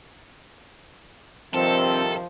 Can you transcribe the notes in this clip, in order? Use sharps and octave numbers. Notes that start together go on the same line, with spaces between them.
G2 C3 D#3 F3 C4 A4